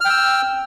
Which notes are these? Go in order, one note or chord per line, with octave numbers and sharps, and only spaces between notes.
G5 E6 F6